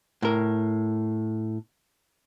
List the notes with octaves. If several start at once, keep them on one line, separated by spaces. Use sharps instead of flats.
A2 A#4